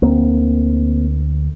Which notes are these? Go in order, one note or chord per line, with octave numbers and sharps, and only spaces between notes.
D2 D3 A#3 C4